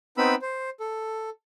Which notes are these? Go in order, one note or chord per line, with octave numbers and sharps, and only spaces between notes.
B3 C4 D#4 B4 B5 E6
C5
A4